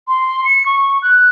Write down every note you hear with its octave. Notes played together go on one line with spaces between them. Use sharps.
C6
C#7
C#6
F#6